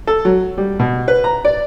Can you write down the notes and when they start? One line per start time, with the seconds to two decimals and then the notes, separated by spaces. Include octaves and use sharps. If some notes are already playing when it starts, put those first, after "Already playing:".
0.07 A4
0.25 F#3
0.58 G3
0.79 B2
1.08 B4
1.24 A#5
1.45 D5